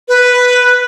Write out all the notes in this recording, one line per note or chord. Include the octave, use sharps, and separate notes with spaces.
B4